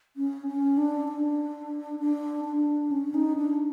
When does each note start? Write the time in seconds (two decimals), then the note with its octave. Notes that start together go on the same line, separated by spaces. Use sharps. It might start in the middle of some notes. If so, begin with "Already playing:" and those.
0.17 C#4
0.47 C#4
0.77 D4
1.08 D4
1.99 D4
2.45 D4
2.91 C#4
3.14 D#4
3.36 D4